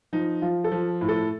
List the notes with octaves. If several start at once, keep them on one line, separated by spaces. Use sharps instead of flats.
F3 D#4
F3 F4
A4
F3
A2
A4